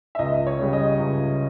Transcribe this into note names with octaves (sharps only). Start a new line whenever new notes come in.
E5
C#2 D#5
C#5
C#3 G3
D#5
C#2